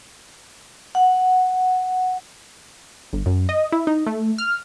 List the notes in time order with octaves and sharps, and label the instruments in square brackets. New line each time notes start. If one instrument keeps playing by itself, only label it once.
[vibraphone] F#5
[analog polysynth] G1
F#2
D#5
E4
D#4
A3
F6